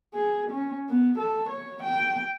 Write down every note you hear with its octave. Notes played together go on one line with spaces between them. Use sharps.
G#4
C#4
B3
A4
C#5
G5